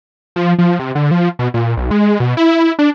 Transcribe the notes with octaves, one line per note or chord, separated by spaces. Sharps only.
F3
F3
C3
D3
F3
B2
A#2
B1
G#3
B2
E4
D4